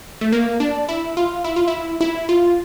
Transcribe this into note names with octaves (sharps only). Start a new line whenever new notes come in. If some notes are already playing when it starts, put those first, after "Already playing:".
A3
A#3
D4
E4
F4
E4
F4
E4
E4
F4